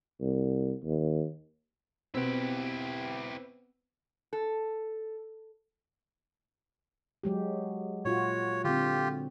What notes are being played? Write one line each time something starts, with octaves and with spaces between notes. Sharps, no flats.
C2
D#2
B2 C4 E4 G4 B4
A4
F#3 G#3 G4
A#2 F4 F#4 C#5
D3 C4 F4 G4